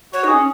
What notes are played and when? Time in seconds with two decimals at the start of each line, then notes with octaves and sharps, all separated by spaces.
0.13 F#4 C#5
0.24 D#4
0.28 G#4
0.34 C#4